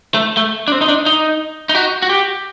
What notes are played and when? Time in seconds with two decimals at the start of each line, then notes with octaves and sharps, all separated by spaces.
0.14 A3
0.37 A3
0.68 D4
0.72 C4
0.82 D#4
0.88 D4
1.06 D#4
1.69 D#4
1.75 F#4
2.02 F#4
2.09 G4